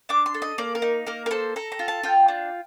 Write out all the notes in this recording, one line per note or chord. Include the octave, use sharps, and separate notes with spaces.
D4 D6
C6
A4
D#5
A#3 D5
A#4
D#4
A#3 A#4
A#4
A4 C5
A4 A#5
A#5
F4
A5
F4 G5
D4